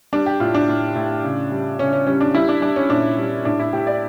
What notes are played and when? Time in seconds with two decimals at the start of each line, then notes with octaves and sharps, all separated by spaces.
0.13 G3 D4
0.26 G4
0.40 A2 F4
0.54 D4
0.68 A2
0.95 A2
1.24 C#3
1.51 G3
1.79 C#3 C#4
1.93 C#4
2.07 G3 C#4
2.20 D4
2.34 G3 E4
2.49 D4
2.62 G3 D4
2.76 C#4
2.90 A#2 D4
3.18 G3
3.45 A2 D4
3.60 E4
3.73 A2 G4
3.87 D5